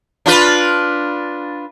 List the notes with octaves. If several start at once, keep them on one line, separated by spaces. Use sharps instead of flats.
D4 F4 B4